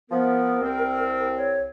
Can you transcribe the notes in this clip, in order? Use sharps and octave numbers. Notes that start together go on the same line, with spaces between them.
F3 B3 A#4
C2 C4
C#5